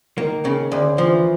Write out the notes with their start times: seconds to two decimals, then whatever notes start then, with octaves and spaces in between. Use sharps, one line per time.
0.18 D#3 A#3
0.45 C#3
0.72 D2
0.97 E3 F3